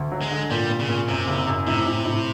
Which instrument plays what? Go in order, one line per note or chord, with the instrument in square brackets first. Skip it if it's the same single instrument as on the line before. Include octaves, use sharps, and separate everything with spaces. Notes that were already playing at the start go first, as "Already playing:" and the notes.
Already playing: [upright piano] D2
F#3
[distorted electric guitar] G#3
[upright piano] D3
[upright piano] A#2 [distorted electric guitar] G3
[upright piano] A#2
[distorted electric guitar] C#3
[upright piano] A#2
[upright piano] F#2 [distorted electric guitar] C3
[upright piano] F#1
F#2
[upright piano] A2 [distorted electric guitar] C3
[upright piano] A2
A2